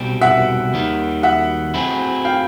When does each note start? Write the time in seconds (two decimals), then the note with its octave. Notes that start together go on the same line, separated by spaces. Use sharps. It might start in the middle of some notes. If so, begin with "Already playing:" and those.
Already playing: C2 B2 G3 C4
0.21 E5 F#5
0.73 D#2 D#3 G3
1.23 E5 F#5
1.74 F#3 A3 C4 E4 G#4
2.25 F5 G5